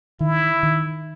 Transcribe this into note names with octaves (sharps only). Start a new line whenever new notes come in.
D#3 E4
D#3